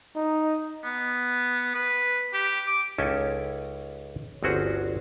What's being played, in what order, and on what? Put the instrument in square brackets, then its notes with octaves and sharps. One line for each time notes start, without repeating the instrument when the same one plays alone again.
[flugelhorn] D#4
[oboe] B3
B4
G4
D6
[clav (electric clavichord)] C#2 C#4 D#4 E4 A4 G#5
G1 D2 C4 C#4 F#4 G#4